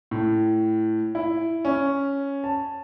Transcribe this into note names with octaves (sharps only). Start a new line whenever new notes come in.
A2
E4
C#4
A5